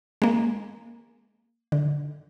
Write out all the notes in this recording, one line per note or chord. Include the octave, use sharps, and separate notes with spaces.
G#3 A#3
D3